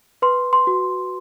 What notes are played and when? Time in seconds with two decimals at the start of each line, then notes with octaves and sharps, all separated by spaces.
0.22 B4 C6
0.53 C6
0.67 F#4